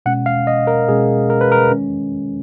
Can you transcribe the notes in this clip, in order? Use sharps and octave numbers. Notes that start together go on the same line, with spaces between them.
B2 G#3 C#4 F#5
F5
D#5
A#4
B2 G#3 C#4 G#4
A#4
B4
A#4
D#3 G#3 C#4